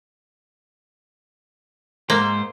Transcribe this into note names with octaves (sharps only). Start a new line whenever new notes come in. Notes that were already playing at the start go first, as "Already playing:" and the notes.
G#2 A#3 C5